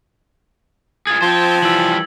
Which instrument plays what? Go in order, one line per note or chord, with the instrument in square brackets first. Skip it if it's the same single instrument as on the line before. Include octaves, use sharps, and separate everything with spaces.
[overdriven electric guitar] F4 G#4 [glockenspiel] G#6 A6
[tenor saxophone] F3 [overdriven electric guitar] C5 G5
[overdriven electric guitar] E3 G3 [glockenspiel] E6 F#7